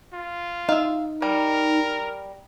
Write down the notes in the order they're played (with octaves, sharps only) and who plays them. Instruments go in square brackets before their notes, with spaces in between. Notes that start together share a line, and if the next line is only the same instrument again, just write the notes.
[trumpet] F4
[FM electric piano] D#4 [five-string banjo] E5 F5
[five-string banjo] G3 [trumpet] A#4